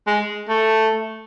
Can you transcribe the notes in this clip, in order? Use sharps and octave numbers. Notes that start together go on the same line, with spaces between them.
G#3
A3